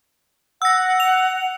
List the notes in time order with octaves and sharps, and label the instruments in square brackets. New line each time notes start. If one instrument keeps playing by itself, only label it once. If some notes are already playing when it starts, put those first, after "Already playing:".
[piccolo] F#5 [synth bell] E6 A#6
[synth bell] F7